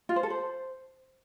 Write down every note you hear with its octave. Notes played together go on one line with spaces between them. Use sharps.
F4
C5
A4
C5